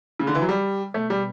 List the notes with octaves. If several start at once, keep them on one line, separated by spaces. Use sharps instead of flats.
C#3
D3
E3
F#3
G3
B2 A3
G3